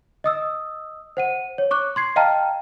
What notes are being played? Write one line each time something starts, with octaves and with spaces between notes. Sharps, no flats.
D#5 D#6 E6
C5 F#5 D#7
C#5
C#6 D6 F#6
C6 G#6 C7
D#5 F5 G5 A5 A#5 F6